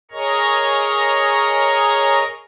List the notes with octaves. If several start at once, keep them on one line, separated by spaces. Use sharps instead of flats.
G#4 A#4 C#5 D#5 A#5 C#6